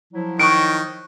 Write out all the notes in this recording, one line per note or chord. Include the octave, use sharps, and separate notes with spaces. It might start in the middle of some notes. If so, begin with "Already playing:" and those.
F3 F#3 E4
D#3 C#6 F#6 D7